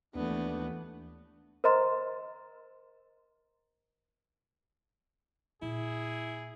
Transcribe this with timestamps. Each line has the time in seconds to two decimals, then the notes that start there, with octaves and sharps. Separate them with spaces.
0.15 D#2 E3 A3 B3 D4
1.64 A#4 C5 D#5 A#5 C6
5.62 A#2 E4 G#4